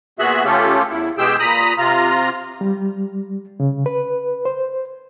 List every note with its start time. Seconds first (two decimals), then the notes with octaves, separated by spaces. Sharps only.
0.19 A#2 B3 F#4 G#4 E5 F#6
0.44 C#3 A3 C#4 F4 G4 A4
0.90 E2 E4
1.18 B2 G#3 G4 G#4 G5 E6
1.40 A#2 A#5 B5 D#6
1.78 C3 F4 A#5
2.61 G3
3.60 C#3
3.86 B4
4.45 C5